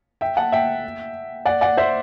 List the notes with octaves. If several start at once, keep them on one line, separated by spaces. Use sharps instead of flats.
E5 G5
F#5 A5
E5 G5
D5 F#5
D5 F#5
C5 E5